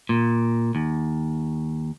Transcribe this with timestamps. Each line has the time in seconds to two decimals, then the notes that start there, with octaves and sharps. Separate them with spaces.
0.09 A#2
0.75 D#2